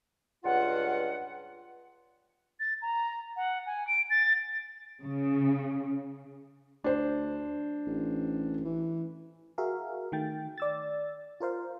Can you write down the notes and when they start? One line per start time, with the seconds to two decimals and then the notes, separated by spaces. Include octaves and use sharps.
0.44 C#2 G2 F4 F#5
2.60 A6
2.82 A#5
3.37 F#5
3.67 G#5
3.87 D7
4.10 A6
5.02 C#3
6.84 D2 D4 C5
7.87 A1
8.65 E3
9.58 F#4 G#4 A#4 E5 F5
10.12 D#3 A3 G5 A6
10.58 D5 E6 A6
11.40 F4 A#4 C5 F5